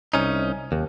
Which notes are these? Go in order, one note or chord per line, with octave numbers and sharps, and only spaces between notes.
C2 C#4 D#4
D#2